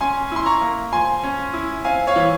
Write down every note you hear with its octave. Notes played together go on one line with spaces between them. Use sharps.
C#4 G#5 C6
E4 C6
A#5 C#6
A#3
F3 G#5 C6
C#4
E4
C4 F5 G#5
C#5 F5
E3